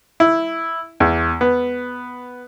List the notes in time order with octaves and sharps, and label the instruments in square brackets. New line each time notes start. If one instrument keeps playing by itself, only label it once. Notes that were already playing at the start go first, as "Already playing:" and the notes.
[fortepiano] E4
E2
B3